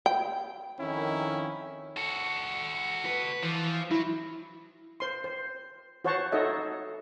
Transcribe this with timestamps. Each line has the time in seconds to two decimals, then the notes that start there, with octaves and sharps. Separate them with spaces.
0.06 G5
0.79 F2 D#3 C#4 E4
1.97 F#4 A4
3.05 B4
3.43 E3 F3
3.91 F#3 E4
5.00 C5 C6
5.24 C5
6.05 F#4 C5 C#5 F#5 A5 C#6
6.32 D#4 F#4 A4 C#5 D#5 E5